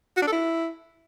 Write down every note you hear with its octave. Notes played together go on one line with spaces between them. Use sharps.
F#4
D4
A4
E4